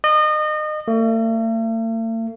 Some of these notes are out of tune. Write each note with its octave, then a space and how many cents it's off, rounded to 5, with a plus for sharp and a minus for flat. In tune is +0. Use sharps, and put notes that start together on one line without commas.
D#5 -30
A3 +45